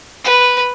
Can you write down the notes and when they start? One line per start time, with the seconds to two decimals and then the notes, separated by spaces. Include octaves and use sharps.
0.24 B4